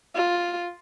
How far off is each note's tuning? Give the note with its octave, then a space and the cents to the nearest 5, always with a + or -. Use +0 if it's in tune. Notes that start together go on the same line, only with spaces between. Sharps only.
F4 +5